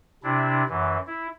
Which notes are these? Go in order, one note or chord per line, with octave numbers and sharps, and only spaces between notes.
C3 D4 E4
F#2 E3
E4